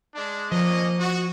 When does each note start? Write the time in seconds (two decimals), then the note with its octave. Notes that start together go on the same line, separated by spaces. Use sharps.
0.15 G#3 D4
0.52 F3 A#3 C#4 D#5
1.00 F#4